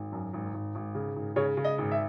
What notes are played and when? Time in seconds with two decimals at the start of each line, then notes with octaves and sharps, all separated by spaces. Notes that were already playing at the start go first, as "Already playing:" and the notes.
Already playing: G#1
0.12 F#2
0.33 G#1
0.54 G#1
0.75 G#1
0.95 C#3
1.16 G#1
1.36 C#3 C#5
1.57 C#3
1.64 D#5
1.78 G#1
1.91 E5